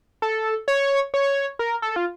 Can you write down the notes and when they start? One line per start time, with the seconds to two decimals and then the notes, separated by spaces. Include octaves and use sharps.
0.22 A4
0.68 C#5
1.14 C#5
1.59 A#4
1.82 A4
1.96 F4